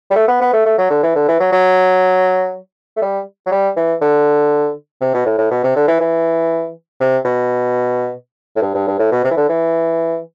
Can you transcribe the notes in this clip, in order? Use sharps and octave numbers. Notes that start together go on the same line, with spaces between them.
G3
A3
B3
B3
A3
A3
F#3
D3
E3
D3
E3
F#3
F#3
A3
G3
F#3
G3
E3
D3
C3
B2
A2
A2
B2
C3
D3
E3
E3
C3
B2
A2
G2
G2
G2
A2
B2
C3
E3
D3
E3